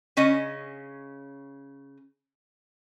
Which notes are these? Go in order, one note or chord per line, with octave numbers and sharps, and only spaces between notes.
C#3 C#4 D#5